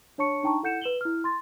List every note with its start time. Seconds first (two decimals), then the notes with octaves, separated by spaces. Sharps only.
0.18 D4 C#5 A5 C#6 C#7
0.43 D4 D#4 G5 A5 A#5 C#6
0.63 E4 A4 F#5 G6 C#7 E7
0.82 B4 E7 F#7 G7
1.01 E4 F6
1.24 C6 A6